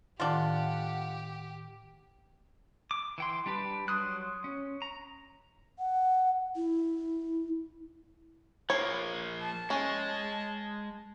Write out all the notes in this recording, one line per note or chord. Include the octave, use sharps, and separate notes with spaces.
A2 D#3 D4 F4 G4 F#5
D6
E3 G5 C6
G3 D4 G4 B4
F#3 C6 D#6 F#6
C#4
A#5
F#5
E4
F3 A#3 C#5
A5
G#3 C#4